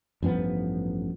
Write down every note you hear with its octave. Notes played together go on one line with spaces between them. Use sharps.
A1 G2 F3 B3